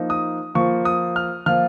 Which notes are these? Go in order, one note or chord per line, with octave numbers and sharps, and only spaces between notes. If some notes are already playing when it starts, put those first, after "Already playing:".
Already playing: F3 A#3 D#4
D#6
F3 A#3 F4 C#6
D#6
F6
F3 A#3 F4 F6